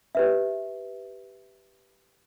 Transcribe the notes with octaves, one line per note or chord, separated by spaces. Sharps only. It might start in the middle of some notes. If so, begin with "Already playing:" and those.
G4 B4 E5